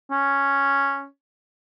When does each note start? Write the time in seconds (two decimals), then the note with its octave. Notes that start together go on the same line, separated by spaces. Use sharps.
0.11 C#4